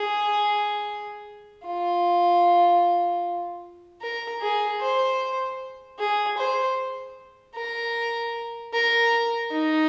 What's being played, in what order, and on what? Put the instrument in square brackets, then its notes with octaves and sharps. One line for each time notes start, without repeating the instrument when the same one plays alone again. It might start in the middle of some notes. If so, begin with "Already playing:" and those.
Already playing: [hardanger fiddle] G#4
F4
A#4
G#4
C5
G#4
C5
A#4
A#4
D#4